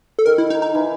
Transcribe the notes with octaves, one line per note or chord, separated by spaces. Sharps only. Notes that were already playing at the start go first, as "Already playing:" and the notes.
A4
D#3 A#4
E4
D#4
D#4
E3